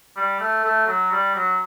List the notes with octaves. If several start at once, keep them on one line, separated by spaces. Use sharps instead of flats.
G3
A3
A3
F#3
G3
F#3